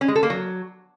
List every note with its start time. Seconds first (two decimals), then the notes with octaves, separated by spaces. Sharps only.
0.01 C#4
0.08 G#3
0.16 A4
0.23 A#3
0.30 F#3